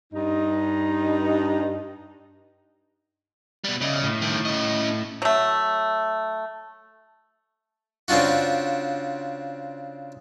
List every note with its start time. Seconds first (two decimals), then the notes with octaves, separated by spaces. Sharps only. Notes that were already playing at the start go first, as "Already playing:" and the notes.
0.13 G2 D#4
3.64 B2 G3
3.81 C#3 D5 D#5
4.03 A2
4.22 G2 D#3
4.45 C#4 D#5
5.22 F#3 A3
8.08 C#3 C4 D4 F4 F#4